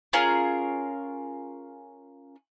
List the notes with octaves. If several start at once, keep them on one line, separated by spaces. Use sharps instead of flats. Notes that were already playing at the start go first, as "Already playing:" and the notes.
C#4 F4 G#4 A#4